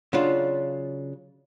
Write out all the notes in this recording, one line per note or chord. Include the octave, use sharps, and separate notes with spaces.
C#3 F#3 D4 F4